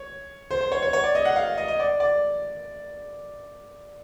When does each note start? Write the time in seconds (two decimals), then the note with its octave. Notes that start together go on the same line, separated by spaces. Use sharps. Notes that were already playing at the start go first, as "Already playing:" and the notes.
Already playing: C#5
0.51 C5
0.61 C5
0.72 C#5
0.83 C#5
0.93 C#5
1.04 D5
1.15 D#5
1.25 F#5
1.36 F5
1.58 D#5
1.68 D#5
1.80 D5
2.00 D5